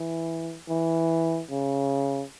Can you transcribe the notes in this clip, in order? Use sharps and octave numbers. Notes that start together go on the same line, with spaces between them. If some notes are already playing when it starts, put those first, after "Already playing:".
Already playing: E3
E3
C#3